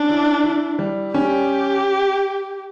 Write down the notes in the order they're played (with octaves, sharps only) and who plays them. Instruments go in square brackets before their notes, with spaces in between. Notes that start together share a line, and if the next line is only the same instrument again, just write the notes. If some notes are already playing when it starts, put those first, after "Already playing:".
Already playing: [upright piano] C#4 [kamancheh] D4
[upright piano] E4
E4
G3
[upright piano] C#4 [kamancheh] G4